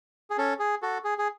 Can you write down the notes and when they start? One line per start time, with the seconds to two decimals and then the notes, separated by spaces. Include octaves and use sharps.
0.30 G#4
0.38 C#4 A4
0.59 G#4
0.82 F#4 A4
1.04 G#4
1.18 G#4